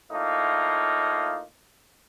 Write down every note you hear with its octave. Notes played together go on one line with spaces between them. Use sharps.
A2 A#3 D#4 F4